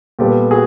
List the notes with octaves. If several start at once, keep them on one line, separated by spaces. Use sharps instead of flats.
A#2 G3 B3 G4 A4
F#4 G#4